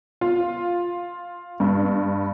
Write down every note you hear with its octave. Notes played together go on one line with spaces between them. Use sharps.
F4
G2